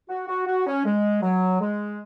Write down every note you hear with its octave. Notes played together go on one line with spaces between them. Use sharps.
F#4
F#4
F#4
C#4
G#3
F#3
G#3